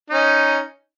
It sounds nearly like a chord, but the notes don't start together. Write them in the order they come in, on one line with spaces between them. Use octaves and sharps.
D#4 C#4 D#5